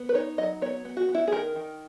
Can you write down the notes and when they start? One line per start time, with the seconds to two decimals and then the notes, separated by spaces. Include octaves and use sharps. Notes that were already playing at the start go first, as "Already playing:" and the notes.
Already playing: B3
0.09 B4
0.14 D#4 C#5
0.38 F#3 D#5
0.62 B3 C#5
0.85 B3
0.97 F#4
1.09 B3
1.15 E4
1.28 G#4
1.32 D#3 A#4
1.56 D#3